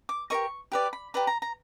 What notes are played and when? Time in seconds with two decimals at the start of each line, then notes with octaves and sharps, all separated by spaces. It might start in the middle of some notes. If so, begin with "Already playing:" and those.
0.09 D6
0.30 G4 A#4 D#5 C#6
0.72 G4 B4 D5
0.93 B5
1.14 G4 B4 D5 A#5
1.27 A#5
1.42 A#5